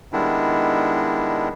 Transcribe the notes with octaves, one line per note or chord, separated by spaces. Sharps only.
D#3 G3 G#3 B3 D4 E4